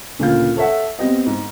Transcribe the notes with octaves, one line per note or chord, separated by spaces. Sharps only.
D2 A#2 C#3 F4 F5 G6
A4 C#5 E5 F#5
B3 C4 G4 D#5
G#2